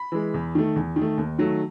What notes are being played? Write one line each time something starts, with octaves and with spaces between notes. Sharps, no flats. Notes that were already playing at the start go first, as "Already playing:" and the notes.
Already playing: B5
E3 G#3
E2
D#3 A3
E2
D#3
A3
D#2
D#3 F#3 A3